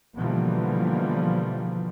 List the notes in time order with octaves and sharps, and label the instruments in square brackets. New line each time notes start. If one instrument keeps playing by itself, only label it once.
[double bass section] B2 D3 E3 F3 G3 A#3